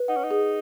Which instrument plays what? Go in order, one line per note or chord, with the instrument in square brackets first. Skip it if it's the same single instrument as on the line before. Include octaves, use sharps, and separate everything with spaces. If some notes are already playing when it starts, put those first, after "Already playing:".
Already playing: [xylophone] B4
[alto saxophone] D#4 [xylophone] F#5
[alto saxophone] C#4
D#4
[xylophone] G#4